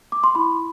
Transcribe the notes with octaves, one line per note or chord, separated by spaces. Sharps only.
D6
C6
E4 B5